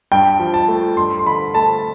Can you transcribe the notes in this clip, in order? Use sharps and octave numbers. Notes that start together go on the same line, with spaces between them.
G2 G5
F3
A5
A3
G2 C6
C6
D3 B5
A3 A5